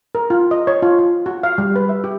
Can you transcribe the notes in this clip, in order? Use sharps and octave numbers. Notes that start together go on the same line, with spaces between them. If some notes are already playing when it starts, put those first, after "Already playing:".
A#4
F4
D#5
C#5
F4
F4
F#4
F5
G3
B4
E5
G4